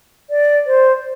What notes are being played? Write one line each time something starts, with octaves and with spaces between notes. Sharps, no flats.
D5
C5